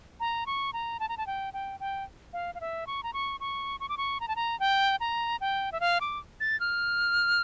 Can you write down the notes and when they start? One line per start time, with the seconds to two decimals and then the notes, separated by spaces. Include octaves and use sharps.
0.20 A#5
0.46 C#6
0.73 A#5
1.00 A5
1.09 A#5
1.18 A5
1.27 G5
1.54 G5
1.80 G5
2.33 F5
2.55 F5
2.61 E5
2.87 C#6
3.03 A#5
3.13 C#6
3.40 C#6
3.80 C#6
3.89 D6
3.98 C#6
4.20 A#5
4.28 A5
4.36 A#5
4.60 G5
5.00 A#5
5.41 G5
5.72 E5
5.80 F5
6.01 D6
6.40 A6
6.60 F6